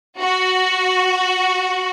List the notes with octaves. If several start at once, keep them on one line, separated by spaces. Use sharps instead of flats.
F#4